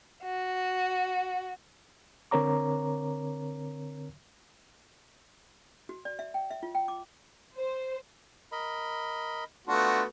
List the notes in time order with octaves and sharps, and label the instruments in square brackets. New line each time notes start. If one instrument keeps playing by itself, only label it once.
[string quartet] F#4
[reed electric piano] D3 C4 A#4 C#5 A#5 D6
[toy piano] F#4
D5
E5
G5
E5
F4
G5
D6
[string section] C5
[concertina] A#4 D#5 B5
[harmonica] A3 B3 F#4 [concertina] D4 F4